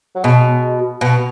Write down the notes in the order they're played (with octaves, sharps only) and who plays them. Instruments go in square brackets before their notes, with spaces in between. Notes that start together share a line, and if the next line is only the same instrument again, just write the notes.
[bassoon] F#3
[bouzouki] B2 [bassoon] G#3
[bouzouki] B2 [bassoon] B3